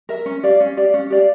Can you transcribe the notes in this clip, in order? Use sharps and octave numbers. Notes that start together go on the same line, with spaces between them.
A#4 E5
C#4
G4 D5 F5
C#4
G4 D5 F5
C#4
G4 D5 F5